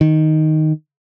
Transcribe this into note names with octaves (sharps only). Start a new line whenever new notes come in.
D#3